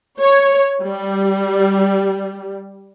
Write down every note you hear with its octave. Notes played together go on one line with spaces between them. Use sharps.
C#5
G3